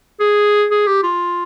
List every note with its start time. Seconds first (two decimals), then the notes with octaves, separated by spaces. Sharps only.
0.20 G#4
0.71 G#4
0.87 G4
1.03 F4